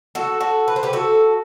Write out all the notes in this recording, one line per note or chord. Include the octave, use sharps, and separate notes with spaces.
F#4 A4
F#4 A4
B4
C5
G4 B4
F#4 A4